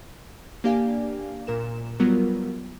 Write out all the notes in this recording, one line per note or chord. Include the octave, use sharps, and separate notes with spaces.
A#3 D4 G4 D5 F5 G#5
A#2 A#4 E7
F#3 G3 B3 F4 A#4